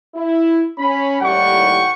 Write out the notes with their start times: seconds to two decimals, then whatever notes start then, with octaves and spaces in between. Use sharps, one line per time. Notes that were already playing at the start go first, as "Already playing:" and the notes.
0.15 E4
0.79 C#4 B5
1.21 D#2 A2 G3 F#5 G5 C#6